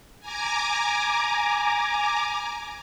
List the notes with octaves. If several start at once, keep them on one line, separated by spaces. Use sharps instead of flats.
G#5 A#5 D6